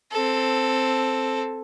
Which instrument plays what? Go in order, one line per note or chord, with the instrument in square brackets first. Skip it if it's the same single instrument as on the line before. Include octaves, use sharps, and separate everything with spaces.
[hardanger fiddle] C4 A4